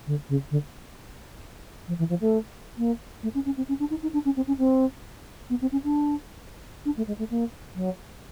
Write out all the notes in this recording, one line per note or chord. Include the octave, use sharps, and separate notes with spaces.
D3
C#3
D3
F3
E3
F3
A3
A#3
A3
C#4
C#4
C4
C#4
D4
D#4
D#4
D4
C#4
C4
C#4
C4
B3
C4
C#4
D4
D4
A3
G#3
A3
A#3
F#3